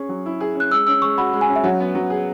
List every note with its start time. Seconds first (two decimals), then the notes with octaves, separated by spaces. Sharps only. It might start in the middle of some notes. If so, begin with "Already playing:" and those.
Already playing: C#4 G#4 C#6
0.09 F#3
0.26 E4
0.40 G#4
0.55 C#4 F#6
0.72 G#3 E6
0.87 C#4 E6
1.02 G#3 C#6
1.18 F#4 B5
1.33 G#3
1.41 G#5
1.48 C#4
1.56 E5
1.64 F#3 F#5
1.80 B3
1.95 F#3
2.10 G#4